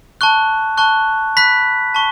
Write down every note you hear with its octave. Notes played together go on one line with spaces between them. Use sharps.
A5 C#6 F#6
A5 C#6 F#6
B5 F#6 B6
A5 C#6